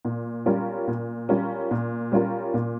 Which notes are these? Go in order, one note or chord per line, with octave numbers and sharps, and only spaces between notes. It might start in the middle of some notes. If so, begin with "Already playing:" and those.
A#2
G3 C#4 F4 A#4
A#2
G3 C#4 F4 A#4
A#2
G3 C#4 F4 A#4
A#2